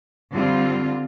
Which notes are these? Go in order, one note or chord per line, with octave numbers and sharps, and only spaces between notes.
D3 G3 C4 F4